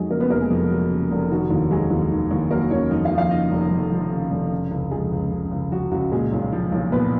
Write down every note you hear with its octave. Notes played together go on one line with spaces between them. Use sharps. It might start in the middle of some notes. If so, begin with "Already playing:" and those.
Already playing: F2 F#3 G#3 D#4 G#4
C#3 A#3 A#4
B3 B4
F1 A#3 A#4
G#3 G#4
F2 F4
F#3
C#3
F1
D#3 F#4
D#2
F#3 G#3 G#4
D#2
D#3
D#2
F#3 A#3 A#4
D#2 C#4 C#5
F2 D#4 D#5
F4 F5
F3
F4 F5
C#3 D#4 D#5
F1
F2
F3
C#3
F1
C#3
C#2
F3 G#3 G#4
C#2
C#3
C#2
F3 F#4
C#2 F#4
A#2 G#3 G#4
B1
F3
B1
A#2 B3 B4